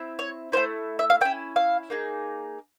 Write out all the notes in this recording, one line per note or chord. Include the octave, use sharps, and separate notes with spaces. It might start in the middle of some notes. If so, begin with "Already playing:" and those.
Already playing: C4 E4
C#5
A3 C#4 E4 C5
E5
F5
A#3 C#4 E4 G5
F5
A#3 D#4 G#4